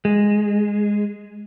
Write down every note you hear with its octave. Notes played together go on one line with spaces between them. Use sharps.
G#3